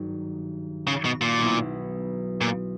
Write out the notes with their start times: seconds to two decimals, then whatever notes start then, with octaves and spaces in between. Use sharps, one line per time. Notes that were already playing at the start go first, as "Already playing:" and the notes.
Already playing: G#1 G2 D#3 F#3
0.87 C#3
1.05 B2
1.21 A#2
1.39 B1 B2 F#3 B3 E4
2.41 A#2